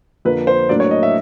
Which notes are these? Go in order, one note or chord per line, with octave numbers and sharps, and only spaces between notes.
F2 D3 F3 A#3 B4
C5
A2 F#3 A#3 D4 D5
C#5
D#5
E5